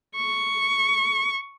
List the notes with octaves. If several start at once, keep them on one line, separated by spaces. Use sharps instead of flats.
C#6